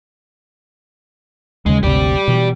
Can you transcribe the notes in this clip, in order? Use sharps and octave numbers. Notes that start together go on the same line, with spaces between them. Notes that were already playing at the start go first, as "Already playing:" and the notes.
D#2 C#3 G#3
G#1 D2 C3 G4 D5
B2 E3